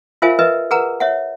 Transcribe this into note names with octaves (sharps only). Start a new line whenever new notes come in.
F4 A#4 C5 E5 F5 G#5
A#4 B4 D#5 E5
G#4 A#4 B4 F#5 A#5
C#5 E5 F#5